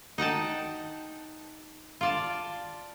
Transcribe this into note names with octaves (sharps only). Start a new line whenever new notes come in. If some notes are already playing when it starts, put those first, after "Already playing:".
D#4 F#5 G5 A5
F4 D5 A5